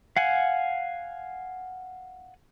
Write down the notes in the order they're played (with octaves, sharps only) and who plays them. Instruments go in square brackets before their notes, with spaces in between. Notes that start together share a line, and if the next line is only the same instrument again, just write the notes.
[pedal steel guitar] F5 F#5 G#5